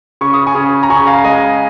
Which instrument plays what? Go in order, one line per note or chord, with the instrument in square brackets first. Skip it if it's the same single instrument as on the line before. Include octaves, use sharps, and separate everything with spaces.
[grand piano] C#3 C#6
D#6
G#5 C#6
C#3
A#5
C#3 G#5 C#6
F5 A#5
G#3 D#5 G#5